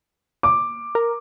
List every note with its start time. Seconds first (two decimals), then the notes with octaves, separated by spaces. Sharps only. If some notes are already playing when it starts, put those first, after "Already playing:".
0.43 D6
0.95 A#4